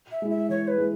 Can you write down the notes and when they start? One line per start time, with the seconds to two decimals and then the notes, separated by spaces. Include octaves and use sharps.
0.12 E5
0.22 G#3 E4
0.30 E5
0.49 E3 C#5
0.68 B4
0.78 G#3 E4